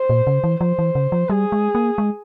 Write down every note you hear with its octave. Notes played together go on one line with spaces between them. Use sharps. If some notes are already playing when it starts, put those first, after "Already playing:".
Already playing: C5
A#2
C#3
E3
F3 C5
E3
C#3
F3
G3 G#4
G#3
A#3
G#3